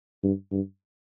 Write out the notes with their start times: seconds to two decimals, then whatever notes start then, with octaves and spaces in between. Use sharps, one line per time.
0.23 G2
0.52 G2